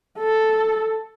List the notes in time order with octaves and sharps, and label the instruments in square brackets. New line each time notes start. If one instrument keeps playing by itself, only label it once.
[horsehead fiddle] A4